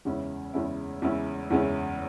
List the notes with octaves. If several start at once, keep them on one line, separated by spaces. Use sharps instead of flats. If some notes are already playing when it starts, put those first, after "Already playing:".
E2 C#3 G#3 C#4 E4
E2 C#3 G#3 C#4 E4
E2 C#3 G#3 C#4 E4
E2 C#3 G#3 C#4 E4